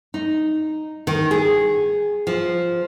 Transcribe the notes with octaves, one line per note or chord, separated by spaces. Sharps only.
D#4
D#3
G#4
F3